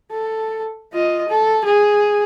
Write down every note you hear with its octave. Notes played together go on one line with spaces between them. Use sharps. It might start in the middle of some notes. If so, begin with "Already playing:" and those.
A4
F4 D#5
A4
G#4